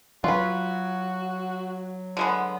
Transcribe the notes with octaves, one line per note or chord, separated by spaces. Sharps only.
F#3 F4 F#4 B4
D3 G#3 B3